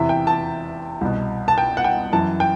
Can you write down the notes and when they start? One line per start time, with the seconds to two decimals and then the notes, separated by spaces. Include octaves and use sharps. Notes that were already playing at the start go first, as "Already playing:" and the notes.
Already playing: E2 C3 E3 E5
0.09 G5
0.27 A5
1.01 C2 B2
1.48 A5
1.58 G5
1.77 F#5
1.84 G5
2.12 F#2 E3 A5
2.40 G5